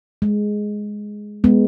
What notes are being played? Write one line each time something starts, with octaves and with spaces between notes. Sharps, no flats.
G#3
G#3 B3